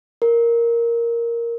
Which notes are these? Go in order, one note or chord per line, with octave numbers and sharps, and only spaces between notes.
A#4